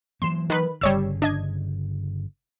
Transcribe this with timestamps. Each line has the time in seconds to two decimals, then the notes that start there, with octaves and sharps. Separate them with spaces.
0.22 E3 F#3 A#3 C6 E7
0.50 D#3 B4 B5
0.81 G1 C#3 G3 C#5 E6
1.22 D4 D#5 G#6